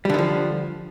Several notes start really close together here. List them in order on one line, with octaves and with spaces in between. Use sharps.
G3 D3 D#3 F3